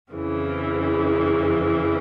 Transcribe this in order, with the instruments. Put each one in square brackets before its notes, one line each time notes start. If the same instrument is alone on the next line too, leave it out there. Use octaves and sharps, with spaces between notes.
[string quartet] F2 C#3 E3